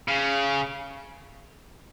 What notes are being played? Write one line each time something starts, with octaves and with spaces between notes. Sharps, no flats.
C#3